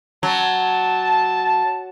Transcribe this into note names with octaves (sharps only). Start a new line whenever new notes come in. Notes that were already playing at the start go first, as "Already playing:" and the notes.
F#3 A5